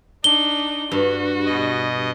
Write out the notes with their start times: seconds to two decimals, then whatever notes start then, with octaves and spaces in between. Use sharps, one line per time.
0.24 D4 D#4 G7
0.91 G2 F#4
1.45 B2 D#5